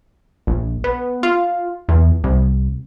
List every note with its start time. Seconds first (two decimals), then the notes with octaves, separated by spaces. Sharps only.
0.47 A#1
0.84 B3
1.23 F4
1.89 E2
2.24 C2